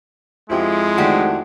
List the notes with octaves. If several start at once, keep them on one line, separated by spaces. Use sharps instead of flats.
F2 F3 G#3 E4 F4 G4
D#3 A3 D4 F#4 G4